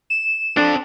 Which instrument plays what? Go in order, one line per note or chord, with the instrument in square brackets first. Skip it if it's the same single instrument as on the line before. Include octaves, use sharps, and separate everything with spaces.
[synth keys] E7
[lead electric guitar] C4 A4 [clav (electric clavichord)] D4